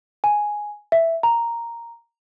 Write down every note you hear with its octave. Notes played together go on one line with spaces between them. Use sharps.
G#5
E5
A#5